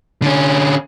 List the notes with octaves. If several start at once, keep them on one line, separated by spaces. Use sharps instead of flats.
D3 C#4